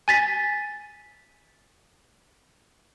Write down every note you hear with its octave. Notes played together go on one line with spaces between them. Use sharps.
G#5 A6 B6